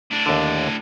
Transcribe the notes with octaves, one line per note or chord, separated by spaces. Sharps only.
A2 D4
D#2 D3